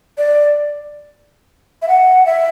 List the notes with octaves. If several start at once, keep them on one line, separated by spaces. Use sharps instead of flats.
D5
E5
F#5
E5